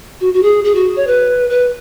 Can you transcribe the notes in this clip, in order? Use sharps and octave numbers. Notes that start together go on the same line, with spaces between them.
F#4
F#4
G#4
G#4
F#4
C#5
B4
B4